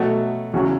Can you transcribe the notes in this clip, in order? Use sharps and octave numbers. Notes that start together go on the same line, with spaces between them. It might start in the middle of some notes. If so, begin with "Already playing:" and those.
Already playing: B2 F#3 A3 F#4
E2 C#3 F#3 F#4